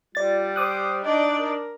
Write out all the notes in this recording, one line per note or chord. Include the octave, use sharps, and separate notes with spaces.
G3 F4 D5 A6
C5 D6 D#6 F#6
D4 D#4 D5 D#5
A#4